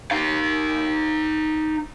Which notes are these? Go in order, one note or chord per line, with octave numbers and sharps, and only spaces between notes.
D#4 F5